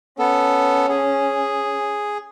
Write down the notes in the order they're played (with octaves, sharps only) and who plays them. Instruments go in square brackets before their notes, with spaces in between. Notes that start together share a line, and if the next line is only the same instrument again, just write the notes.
[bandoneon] B3 A4 [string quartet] C#4
[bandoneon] G#4